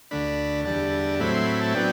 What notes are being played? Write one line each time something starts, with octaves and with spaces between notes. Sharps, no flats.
D2 D3 A3 D4 B5
E2 D3 G3 D4 A5
A2 F#3 A3 C4 E4 B5
C6
B5
A5
F#3 B3 D4 G5